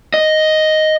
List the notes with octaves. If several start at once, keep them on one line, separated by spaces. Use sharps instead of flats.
D#5